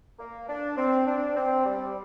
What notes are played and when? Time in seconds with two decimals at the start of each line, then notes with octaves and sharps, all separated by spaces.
0.19 A#3
0.49 D4
0.78 C4
1.07 D4
1.36 C4
1.65 G3